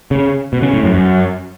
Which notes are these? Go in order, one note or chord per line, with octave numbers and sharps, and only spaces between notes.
C#3
B2
C#3
A2
F#2
F#2